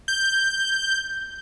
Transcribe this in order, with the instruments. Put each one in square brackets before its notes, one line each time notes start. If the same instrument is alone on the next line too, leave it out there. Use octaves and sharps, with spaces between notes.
[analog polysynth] G6